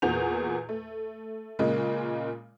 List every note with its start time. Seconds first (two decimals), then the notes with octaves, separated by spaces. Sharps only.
0.02 E2 A#2 F#4 G#4 G6 F7
0.69 A3
1.59 A#2 C#3 G#3 A#3